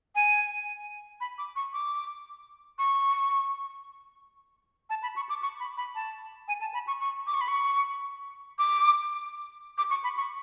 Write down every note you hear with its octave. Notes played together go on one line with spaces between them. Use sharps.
G#5
B5
D6
C#6
D6
C#6
A5
B5
C#6
D6
C#6
B5
B5
A5
G#5
A5
B5
C#6
C#6
D6
C#6
B5
C#6
D6
D6
C#6
B5
C#6